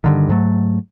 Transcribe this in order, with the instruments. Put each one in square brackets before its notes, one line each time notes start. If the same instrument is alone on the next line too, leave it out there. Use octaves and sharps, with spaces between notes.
[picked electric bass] G2 D3 D#3
G#2 F#3 A3